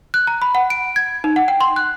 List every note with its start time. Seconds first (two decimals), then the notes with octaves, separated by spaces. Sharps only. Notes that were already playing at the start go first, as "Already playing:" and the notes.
0.14 F#6
0.27 A#5
0.42 B5
0.55 F#5
0.70 D7
0.96 G#6
1.24 D#4
1.36 F#5
1.48 G5
1.61 C6
1.76 F#6